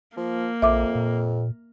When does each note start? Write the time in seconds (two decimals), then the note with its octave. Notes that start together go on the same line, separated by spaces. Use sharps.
0.17 F3 A#3
0.62 A#1 F2 E5 D6
0.95 A#2